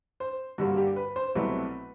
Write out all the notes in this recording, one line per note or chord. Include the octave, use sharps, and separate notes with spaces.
C5
G2 D3 G3 A#3 F#4
G4
B4
C5
C2 B2 F#3 A3 C4 B4